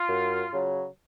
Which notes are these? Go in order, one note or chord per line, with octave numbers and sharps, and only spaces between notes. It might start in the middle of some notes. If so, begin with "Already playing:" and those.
Already playing: F4
F#2
C#3 F#3